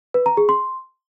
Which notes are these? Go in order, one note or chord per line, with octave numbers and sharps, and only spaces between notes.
B4
A#5
G#4
C6